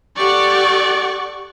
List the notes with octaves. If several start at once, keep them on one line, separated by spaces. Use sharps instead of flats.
G4 A4 D5 F#5 C#6